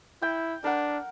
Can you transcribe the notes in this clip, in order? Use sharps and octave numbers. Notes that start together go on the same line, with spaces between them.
E4 G5
D4 A#4 F#5